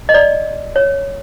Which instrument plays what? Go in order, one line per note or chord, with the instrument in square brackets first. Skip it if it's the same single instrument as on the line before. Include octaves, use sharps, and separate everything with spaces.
[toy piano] D#5
D5
C#5